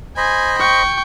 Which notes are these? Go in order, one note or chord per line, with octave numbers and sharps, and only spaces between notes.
C5 D#5 G#5 B5
G5 C#6